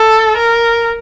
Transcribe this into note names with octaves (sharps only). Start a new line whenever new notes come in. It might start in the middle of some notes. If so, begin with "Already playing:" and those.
Already playing: A4
A#4